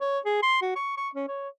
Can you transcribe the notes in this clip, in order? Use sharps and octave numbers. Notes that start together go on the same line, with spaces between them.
C#5
G#4
C6
F#4
C#6
C#6
C#4
C#5